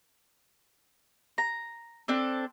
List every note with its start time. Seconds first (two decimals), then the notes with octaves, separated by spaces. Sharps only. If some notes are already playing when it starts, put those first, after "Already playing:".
1.38 A#5
2.08 C4 D4 A4